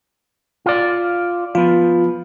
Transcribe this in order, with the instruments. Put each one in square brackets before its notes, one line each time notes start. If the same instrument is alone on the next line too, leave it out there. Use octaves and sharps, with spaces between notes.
[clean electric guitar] F4 D5
[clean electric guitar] F3 B3 [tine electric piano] F4